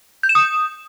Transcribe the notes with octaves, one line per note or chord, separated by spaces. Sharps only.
G6
E7
D#6